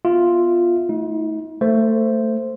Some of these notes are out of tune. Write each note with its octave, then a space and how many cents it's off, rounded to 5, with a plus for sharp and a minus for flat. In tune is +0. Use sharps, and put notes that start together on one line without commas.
B3 +0 F4 +0 E5 +0
A3 +0 D#4 +45
A3 +20 C5 +0